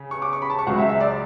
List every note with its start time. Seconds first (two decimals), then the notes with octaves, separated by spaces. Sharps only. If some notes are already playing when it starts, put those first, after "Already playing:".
Already playing: C#3
0.11 C#6
0.22 D6
0.33 C#6
0.42 B5
0.50 A5
0.59 C#6
0.67 C#2 C#3 F#3 F#5
0.78 E5
0.89 E5
1.00 D5